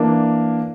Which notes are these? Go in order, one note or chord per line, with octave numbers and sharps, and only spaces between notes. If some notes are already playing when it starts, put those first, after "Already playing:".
Already playing: E3 A#3 D4